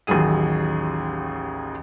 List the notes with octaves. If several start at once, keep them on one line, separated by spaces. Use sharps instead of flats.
A1 D#2 D#3 F#3 G#4 D#7